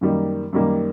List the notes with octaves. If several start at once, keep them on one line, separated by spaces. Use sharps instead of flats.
F#2 D#3 G3 A#3
F#2 D#3 G3 A#3